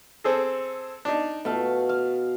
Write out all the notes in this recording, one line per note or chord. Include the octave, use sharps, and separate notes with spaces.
C4 G#4 A4
D4 D#4
B2 A3 F5
F5